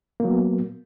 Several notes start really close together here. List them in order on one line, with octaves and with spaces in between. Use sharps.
A#3 F#3 B3